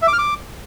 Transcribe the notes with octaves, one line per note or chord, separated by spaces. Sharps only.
E5
D6
F6
D6